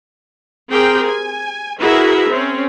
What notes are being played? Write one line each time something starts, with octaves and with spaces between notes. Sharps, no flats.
C4 G4 G#4 A#4 G5 C6
G#5
E4 F#4 G#4 A#4 B4 E5
C4 C#4